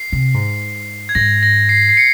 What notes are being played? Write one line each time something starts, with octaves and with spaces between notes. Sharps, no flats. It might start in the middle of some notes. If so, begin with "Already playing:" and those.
Already playing: C7
C3
G#2
G#6
G#2 A#6
A#6
C7
C7
C#7